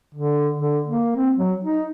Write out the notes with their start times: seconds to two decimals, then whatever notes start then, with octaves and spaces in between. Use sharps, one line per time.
0.15 D3
0.58 D3
0.87 A#3
1.16 C4
1.36 F#3
1.64 D#4